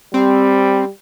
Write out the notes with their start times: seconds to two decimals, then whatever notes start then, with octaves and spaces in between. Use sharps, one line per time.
0.14 G3 C4